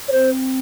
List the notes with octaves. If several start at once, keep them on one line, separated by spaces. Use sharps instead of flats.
C#5
C4 C5